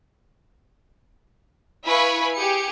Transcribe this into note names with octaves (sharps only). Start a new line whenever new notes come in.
E4 B4 F5 G#5 B5 C#6
G4 G#4 C#7